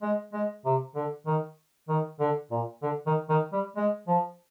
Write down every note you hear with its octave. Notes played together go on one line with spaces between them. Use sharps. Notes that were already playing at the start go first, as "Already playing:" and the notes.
G#3
G#3
C3
D3
D#3
D#3
D3
A#2
D3
D#3
D#3
G3
G#3
F3